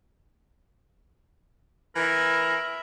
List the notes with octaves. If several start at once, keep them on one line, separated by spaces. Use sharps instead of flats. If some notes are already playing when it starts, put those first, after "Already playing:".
E3 A#4 E5 B5